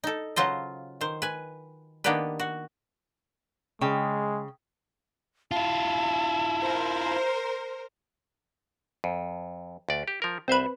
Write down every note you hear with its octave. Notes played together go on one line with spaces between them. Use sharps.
D#4 A4
C#3 F#3 F4 C5 D#5
D#3 C5
B4 G#5
D#3 A#3 B3 D4 G4 B4
F#4
C#3 G#3 G5
E4 F4 A5
A#4 C5
F2
D2 D5
G4
F3 A#4
C2 C4 B4 C5 E5